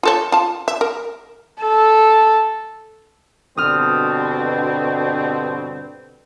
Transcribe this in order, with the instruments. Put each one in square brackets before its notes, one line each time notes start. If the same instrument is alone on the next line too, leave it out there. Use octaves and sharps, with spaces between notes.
[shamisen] F4 A4 C#5
F4 A5
E5
A#4
[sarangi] A4
[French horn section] G2 B2 [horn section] D3 C4 [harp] D#6 F6